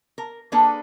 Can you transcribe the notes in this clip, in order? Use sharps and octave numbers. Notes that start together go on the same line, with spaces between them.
A#4
A#3 D4 G#4 A4 B4